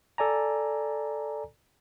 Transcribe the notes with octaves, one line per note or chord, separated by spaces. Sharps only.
A4 D5 G#5 A#5